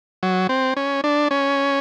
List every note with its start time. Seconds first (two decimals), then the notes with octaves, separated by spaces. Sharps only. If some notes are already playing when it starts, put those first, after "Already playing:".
0.23 F#3
0.49 C4
0.77 C#4
1.04 D4
1.31 C#4